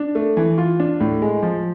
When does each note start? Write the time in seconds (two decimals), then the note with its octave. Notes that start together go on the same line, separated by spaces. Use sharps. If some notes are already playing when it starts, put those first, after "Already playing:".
Already playing: D4
0.15 A3
0.37 E3
0.58 F4
0.80 D4
1.00 A2
1.22 G#3
1.43 F3